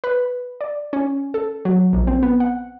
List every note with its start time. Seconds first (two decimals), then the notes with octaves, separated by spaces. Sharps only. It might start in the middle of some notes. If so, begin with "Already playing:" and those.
0.04 B4
0.61 D5
0.93 C#4
1.34 A4
1.65 F#3
1.93 A#1
2.07 C4
2.23 B3
2.40 F#5